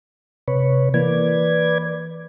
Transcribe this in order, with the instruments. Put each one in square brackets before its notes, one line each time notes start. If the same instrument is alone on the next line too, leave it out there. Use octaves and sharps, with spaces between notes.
[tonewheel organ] C3 B4 C#5
[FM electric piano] E3 A#3 [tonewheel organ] B4 D5 G#6